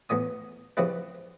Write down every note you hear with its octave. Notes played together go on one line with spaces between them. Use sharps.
E2 A2 B3 D#6
C#3 F3 G3 C4 E4 B4